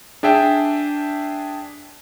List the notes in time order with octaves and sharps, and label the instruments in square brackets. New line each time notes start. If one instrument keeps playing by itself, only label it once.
[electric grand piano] D4 G#4 E5 G5 A5